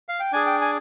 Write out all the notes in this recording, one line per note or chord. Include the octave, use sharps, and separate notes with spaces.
F5
G5
D4 G#4 G#5
G5
G#5